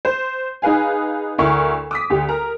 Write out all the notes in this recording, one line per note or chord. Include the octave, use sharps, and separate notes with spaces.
C5
D#4 G#4 B4 F5 G#5
D2 E4 A#4 C#6
D6 D#6 B6
D2 G4
A#4 A#5